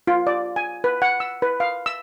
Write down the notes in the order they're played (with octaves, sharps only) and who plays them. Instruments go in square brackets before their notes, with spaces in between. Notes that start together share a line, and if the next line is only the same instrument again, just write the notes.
[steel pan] F4
D5
G#5
B4
F#5
E6
B4
F5
E6